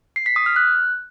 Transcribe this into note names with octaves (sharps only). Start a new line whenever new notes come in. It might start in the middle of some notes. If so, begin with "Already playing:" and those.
C7
B6
D#6
F6
F#6